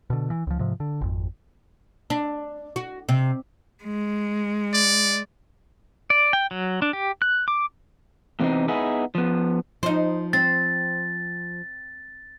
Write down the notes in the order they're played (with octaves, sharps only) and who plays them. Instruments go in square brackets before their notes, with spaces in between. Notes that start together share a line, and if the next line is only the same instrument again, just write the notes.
[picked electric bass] B2 D3
E3
C#2 F3
G#2 C3 F3
D3
G#1 F2
[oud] D4
F#4
C3
[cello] G#3
[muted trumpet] D5
[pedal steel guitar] D5
G5
F#3
D4
G4
F#6
D6
[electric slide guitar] E2 C3 E3 F#3 C4 D#4
B3 D#4 E4 G#4
F3 B3
[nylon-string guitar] F3 [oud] D#4 C5
[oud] C4 [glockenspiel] A6